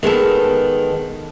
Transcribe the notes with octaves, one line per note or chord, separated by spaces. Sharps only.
D#3 G#3 B3 A4